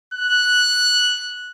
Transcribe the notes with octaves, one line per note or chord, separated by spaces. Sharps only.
F#6